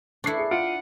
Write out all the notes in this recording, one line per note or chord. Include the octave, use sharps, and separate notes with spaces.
D4 E4 C#6 C7 C#7
G#4
F4 F#5 D7